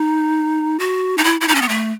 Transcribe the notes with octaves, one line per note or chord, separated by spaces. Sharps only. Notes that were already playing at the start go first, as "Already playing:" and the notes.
Already playing: D#4
F#4
D#4
E4
E4
D#4
C#4
B3
A3